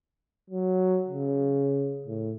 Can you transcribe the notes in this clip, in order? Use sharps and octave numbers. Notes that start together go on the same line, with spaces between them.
F#3
C#3
A2